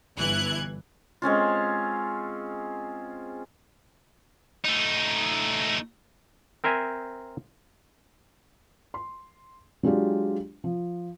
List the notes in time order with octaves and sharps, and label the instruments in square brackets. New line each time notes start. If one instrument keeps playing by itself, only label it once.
[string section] G1 E3 F#6 G#6
[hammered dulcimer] G#3 C4 C#4 F4
[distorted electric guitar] A3 D#4
[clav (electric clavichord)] C4 A#4 C5 E5 G#5
[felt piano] C6
F#3 G#3 D4 F4 G4
F3